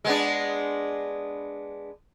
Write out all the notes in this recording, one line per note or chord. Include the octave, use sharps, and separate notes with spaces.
G#3 B3 D4